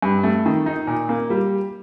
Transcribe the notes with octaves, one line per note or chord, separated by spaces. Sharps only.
G2
A3
D#3
D#4
A#2
A#3
G3